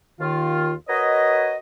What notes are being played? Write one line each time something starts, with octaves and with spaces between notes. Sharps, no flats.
D#2 D#3 F4
F#4 A#4 B4 C#5 D#5